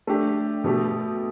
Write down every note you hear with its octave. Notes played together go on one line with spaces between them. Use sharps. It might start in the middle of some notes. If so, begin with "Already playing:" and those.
A3 D4 G4
B2 A3 G4